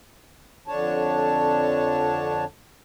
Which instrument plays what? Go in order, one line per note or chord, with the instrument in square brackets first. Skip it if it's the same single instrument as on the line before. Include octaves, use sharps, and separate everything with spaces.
[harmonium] F2 D3 D4 C#5 A5